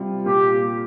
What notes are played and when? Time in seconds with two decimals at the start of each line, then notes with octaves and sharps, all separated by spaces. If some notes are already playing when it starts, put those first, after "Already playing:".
Already playing: C3 G3 C4 F4
0.26 A#2 A#3 F4 G4